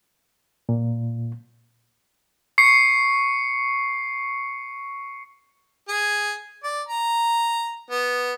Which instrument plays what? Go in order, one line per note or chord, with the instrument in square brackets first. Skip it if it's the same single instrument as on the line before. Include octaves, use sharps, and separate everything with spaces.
[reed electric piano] A#2
[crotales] C#6 C7 C#7
[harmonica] G#4
D5
A#5
B3